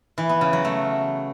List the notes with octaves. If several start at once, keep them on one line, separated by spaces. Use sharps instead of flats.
E3
B3
C#3
F#3
A3